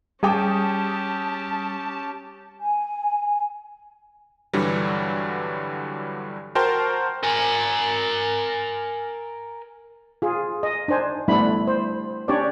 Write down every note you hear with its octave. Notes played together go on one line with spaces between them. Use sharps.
G3 C#4 G4 G#4 G5 A5 D6 D#6
G#5
G2 D3 E3 F#3 G3
F#4 A#4 C5 G5 A5 C6
A#4 G#5
F4 G#4
D#5
D4 D#4 C5 G#5
G3 A3 B3 D4 E4 B5
C5
C#4 D4 G4 C#5 D5